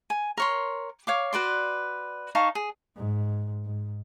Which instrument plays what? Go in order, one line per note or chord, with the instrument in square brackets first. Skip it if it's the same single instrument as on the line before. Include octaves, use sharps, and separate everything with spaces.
[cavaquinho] G#5
A#4 C#5 C6
C#5 F5 D6
F#4 B4 D5 C6
D#4 F5 A5 C#6
G#4
[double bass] G#2
G#2